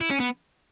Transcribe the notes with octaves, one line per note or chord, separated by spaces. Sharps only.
E4
C#4
B3